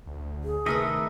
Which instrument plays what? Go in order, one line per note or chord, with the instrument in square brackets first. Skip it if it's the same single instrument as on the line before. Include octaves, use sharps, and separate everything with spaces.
[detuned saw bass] D2
[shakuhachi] G#4
[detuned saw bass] C3 [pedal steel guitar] D#3 D#5 E5 [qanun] A3 A#4 B4